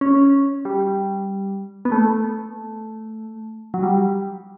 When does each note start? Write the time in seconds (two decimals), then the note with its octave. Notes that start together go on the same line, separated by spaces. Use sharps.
0.01 C#4
0.65 G3
1.85 B3
1.92 A3
3.74 F#3
3.83 G3